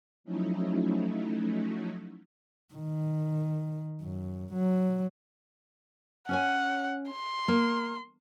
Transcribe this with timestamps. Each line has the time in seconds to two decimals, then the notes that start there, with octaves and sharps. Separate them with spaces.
0.24 F3 F#3 A3 C#4 D#4 E4
2.74 D#3
4.02 F#2
4.53 F#3
6.29 C#4 C#5 F#5 G#5
7.11 C6
7.48 A#3